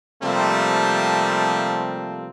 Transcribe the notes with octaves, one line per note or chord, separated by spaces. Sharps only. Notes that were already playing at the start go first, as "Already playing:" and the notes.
C3 F3 G3 A3 A#3 C4